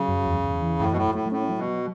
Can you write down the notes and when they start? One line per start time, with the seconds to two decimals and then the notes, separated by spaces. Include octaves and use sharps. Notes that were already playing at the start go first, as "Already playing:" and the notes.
Already playing: C#3 F#3
0.08 F#2
0.26 E2
0.44 E2
0.62 E3
0.79 F#2 A2
0.92 B2
0.97 A2 F#3
1.15 A2 A3
1.32 A2 C#4
1.49 F#3
1.58 B2
1.67 F#3